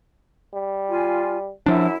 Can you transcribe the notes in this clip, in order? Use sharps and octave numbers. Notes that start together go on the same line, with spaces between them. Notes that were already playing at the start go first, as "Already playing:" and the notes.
G3
F4 G#5
F#2 F3 D4 E4